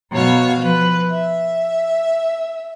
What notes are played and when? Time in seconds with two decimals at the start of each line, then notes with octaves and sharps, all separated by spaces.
0.12 B2 F#3 F#4 C#5 F5
0.59 F3 B4
1.10 E5